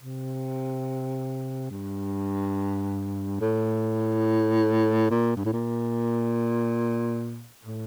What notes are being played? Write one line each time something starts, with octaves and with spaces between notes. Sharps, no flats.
C3
G2
A2
A#2
G2
A2
A#2
A2